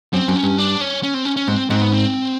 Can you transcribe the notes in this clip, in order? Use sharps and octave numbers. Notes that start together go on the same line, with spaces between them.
F#2 C4
F#2
C#4
G2
D4
C#4
C#4
C4
C#4
C#4
G#2 C4
G#2 C4
B3
C4